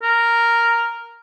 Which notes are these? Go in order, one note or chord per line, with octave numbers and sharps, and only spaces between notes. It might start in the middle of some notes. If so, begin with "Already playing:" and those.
A#4